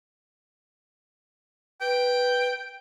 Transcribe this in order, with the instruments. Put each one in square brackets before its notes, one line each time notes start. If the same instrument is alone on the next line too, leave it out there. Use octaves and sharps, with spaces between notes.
[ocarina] B4 [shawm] G5